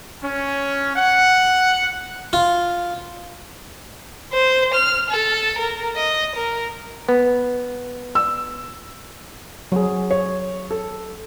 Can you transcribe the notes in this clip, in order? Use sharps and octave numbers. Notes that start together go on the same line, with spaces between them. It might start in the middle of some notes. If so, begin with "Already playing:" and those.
C#4
F#5
F4
C5
F6
A4
A#4
D#5
A#4
B3
E6
F#3 G#4
C#5
A4